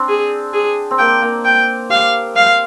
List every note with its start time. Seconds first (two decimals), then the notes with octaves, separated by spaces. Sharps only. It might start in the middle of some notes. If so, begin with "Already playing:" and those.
Already playing: C4 D4
0.08 G#4
0.54 G#4
0.91 C4
0.99 A#3 G5
1.22 A#3
1.45 G5
1.90 G4 F5
2.36 F5